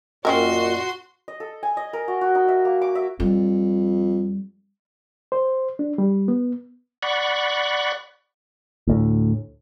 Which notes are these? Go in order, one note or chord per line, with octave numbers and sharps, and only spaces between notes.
F#2 A#2 C4 C#4 F#4 A#4 D#5 C6
D#5
A4
G#5
D#5
A#4
F#4
F#4
D#4
E5
A#3
D6
E5
F2 G3
C5
D4
G3
B3
D5 F#5 B5 C#6
D2 A2